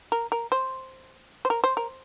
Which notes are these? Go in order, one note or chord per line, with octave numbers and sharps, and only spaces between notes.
A#4
A#4
C5
C5
A#4
C5
A#4